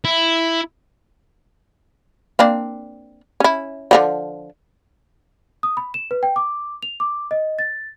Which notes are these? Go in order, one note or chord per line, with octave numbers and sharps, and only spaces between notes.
E4
A#3 C4 D4
C#4 E4
D3 F3 F#3
D#6
B5
E7
B4
G5
D6
F7
D6
D#5
A6